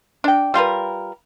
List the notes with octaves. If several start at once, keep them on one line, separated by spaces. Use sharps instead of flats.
D4 G5
G3 F4 A#4 B4